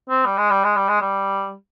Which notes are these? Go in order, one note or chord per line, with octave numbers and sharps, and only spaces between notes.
C4
G3
G#3
G3
G#3
G3
G#3
G3